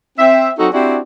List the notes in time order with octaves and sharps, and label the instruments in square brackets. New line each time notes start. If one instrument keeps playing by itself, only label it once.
[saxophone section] C4 E5
F#3 C4 D#4 F#4 A4
C4 D4 E4 F#4 G4